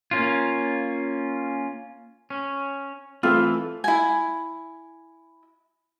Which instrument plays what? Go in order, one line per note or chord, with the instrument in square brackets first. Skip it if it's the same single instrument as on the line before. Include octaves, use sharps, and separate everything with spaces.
[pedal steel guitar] A#3 C#4 F4
[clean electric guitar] C#4
[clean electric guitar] E3 [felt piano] A3 C4 [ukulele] F4
[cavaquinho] E4 G#5